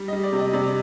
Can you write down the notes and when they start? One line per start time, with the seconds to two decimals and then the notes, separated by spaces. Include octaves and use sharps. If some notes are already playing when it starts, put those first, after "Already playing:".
Already playing: G3
0.08 D#5
0.13 G3
0.23 D5
0.33 C3
0.39 D#5
0.53 C3 D5